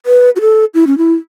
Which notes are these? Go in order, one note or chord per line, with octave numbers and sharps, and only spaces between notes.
B4
F#4
A4
E4
C#4
E4